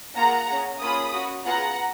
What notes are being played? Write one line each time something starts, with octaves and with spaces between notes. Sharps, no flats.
A#3 F4 G#4 F#5 A#5
C#4 G#4
A#3 C#4 F4 G#4 B5 D#6
C#4 F#4
B3 F4 G#4 F#5 A#5